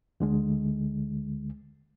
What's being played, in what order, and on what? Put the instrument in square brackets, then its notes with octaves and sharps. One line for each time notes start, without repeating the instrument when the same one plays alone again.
[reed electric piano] D2 D3 G#3